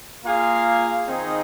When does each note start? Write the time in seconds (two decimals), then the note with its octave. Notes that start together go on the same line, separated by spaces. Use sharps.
0.24 A#3 F4 G#4 F5
1.07 D#3 C4 D#4 G#4 D#5